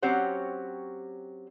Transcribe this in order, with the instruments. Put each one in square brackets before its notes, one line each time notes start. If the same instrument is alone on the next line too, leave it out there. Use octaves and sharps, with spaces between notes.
[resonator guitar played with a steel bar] F#3 C4 C#4 G4 C5 F#5